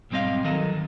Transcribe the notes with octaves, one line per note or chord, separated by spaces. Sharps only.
B1 G#2 G3 C4 D#5 F5
D#3 F#3 A4 D#5